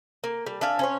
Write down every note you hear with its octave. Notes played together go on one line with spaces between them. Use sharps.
A#3
G3
D4 E5 F5 G#5
C#4 C5 C#5